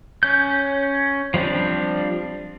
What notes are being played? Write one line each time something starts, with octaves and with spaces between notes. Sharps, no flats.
C#4 G6
F3 G3 C4 D4